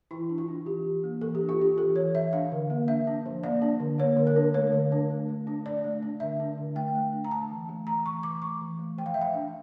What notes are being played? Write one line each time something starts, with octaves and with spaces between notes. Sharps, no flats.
E3 E4
D4
F4
D4
E3 G4
E3
A#3
E3 A4
G4
D4
F4
D4 G4
E3 A4
E3 C#5
E3 E5
D4 F5
D3
A#3
D4 E5
D4
F3
A#3 D5
D4
D3
A#3 C#5
D3
A#4
D4
A3 C#5
D3
D4
A3
A3
D4
D4 D5
A3
D4
D3 E5
D4
D3
A3 G5
A3
D4
A#5
A3 A5
E3
A3
E3 A#5
E3 C#6
E3 D6
A3 C#6
E3
A3
F3 G5
F5
F3 E5
F5
D4